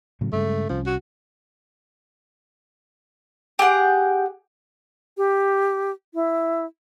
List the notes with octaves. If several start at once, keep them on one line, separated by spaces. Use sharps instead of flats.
A2 C#3 F#3
G2 C#3 G#3 A3
C2 F3 C#4
F#4
G4 G#4 F#5 G5
G4
E4